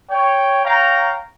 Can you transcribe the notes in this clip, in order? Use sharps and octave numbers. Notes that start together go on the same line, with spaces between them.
C#5 G5
C#5 F5 G5 A#5